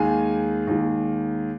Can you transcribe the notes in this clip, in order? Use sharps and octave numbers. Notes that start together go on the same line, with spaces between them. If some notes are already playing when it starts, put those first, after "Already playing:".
Already playing: D#2 D#3 G#3 G#5
D#2 D#3 G#3